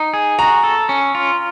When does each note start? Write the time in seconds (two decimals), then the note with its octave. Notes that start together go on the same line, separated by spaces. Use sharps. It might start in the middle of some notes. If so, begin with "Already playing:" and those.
Already playing: D#4
0.14 G#4
0.39 F#4 A#5
0.64 A4
0.89 C#4
1.15 F4